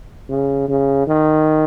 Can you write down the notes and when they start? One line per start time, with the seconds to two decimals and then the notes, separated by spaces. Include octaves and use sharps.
0.30 C#3
0.68 C#3
1.07 D#3